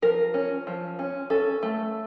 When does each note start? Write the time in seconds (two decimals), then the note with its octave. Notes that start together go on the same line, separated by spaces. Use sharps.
0.02 F3 A#4
0.34 C#4
0.67 F3
0.99 C#4
1.30 C#4 A4
1.63 A3